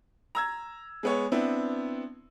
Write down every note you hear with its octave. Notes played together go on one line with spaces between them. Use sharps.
A#5 E6 G#6
G#3 B3 C#5
B3 C4 D4 E4